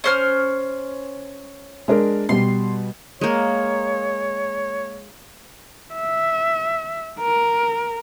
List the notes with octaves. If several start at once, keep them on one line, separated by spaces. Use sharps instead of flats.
C#4 C5 F6
G#3 D4 A#4
B2 G3 C6
G#3 A#3 C#5
E5
A#4